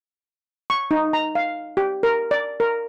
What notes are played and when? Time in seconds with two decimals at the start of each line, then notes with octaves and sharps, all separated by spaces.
0.70 C#6
0.91 D#4
1.13 A#5
1.35 F5
1.77 G4
2.03 A#4
2.31 D5
2.60 A#4